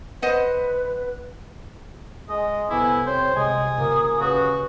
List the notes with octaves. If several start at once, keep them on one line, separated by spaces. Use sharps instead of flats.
B4 C5 D#5 F#5
G#3 D#5
C2 B3 E4 A4 G#5 D6
C4 C5 C#5
C3 G#3 G#5 D#6
A#2 C#3 A#3
C#3 F#4 G4 B4